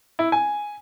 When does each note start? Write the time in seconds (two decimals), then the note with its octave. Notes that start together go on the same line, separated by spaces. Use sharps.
0.19 E4
0.32 G#5